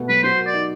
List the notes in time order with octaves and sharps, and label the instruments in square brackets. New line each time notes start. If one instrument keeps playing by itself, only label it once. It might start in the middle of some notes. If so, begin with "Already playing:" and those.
Already playing: [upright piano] B2 A3 B3
[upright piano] F#3 [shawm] B4
[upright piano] F#4 [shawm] C5
[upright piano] A#4
[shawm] D5
[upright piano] D#4